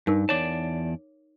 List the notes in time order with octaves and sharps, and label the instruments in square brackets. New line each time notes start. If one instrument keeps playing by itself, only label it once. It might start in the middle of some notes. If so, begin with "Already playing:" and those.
[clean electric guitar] G2 [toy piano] D#4 A#4
[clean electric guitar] E2 D5 A5 [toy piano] C#5 D6